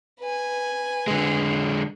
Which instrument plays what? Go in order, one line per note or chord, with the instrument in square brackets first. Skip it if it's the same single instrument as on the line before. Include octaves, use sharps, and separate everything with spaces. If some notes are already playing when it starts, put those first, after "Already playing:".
[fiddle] B4 G#5
[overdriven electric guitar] D3 G#3